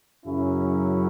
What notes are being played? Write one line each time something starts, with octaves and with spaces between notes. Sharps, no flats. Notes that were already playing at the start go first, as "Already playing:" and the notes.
F#2 C#3 F#3 C#4 E4